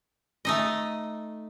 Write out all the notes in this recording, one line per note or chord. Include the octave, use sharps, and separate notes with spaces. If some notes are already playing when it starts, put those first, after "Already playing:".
A3 D#4 D#5